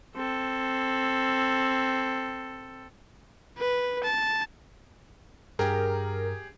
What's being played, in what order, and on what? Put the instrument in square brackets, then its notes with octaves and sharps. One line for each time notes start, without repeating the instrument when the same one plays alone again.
[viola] C4 A4
[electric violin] B4
A5
[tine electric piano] G2 [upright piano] G4 G#4 [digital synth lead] A#4